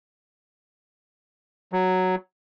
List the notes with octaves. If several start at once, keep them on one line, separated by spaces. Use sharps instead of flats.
F#3